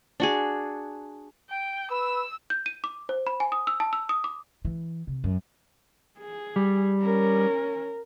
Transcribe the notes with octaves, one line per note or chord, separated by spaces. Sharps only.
D4 F#4 G#4
G5
B4 E6
G6
D#7
D6
C5
B5
G#5
D#6
E6
A5
E6
D#6
D6
E3
C3
F#2
G#4
G3
C#4 A#4